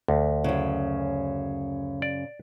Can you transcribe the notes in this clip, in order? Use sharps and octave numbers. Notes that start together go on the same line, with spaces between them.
D2
F#2 C#3
D5